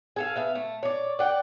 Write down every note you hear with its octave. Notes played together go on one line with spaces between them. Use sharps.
G#4 A4 F5
B3 E5 F5
A3
C#5 D5
D5 F#5 G5